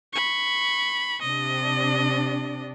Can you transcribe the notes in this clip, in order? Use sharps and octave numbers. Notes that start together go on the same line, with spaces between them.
B5 C#6
C3 D4 D#5